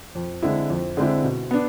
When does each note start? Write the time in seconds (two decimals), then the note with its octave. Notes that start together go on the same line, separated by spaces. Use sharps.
0.15 F2
0.43 D3 G#3 C4 E4
0.70 F2
0.97 D3 G#3 C4 E4
1.24 B2
1.51 B3 D4